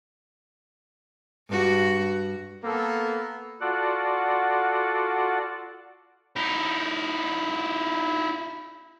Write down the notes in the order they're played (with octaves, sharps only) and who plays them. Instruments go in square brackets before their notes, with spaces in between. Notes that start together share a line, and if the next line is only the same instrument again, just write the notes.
[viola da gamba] G2 F#4
[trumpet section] A#3 B3 A4
[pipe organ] F4 F#4 A4 D5 F#5
[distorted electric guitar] D#4 E4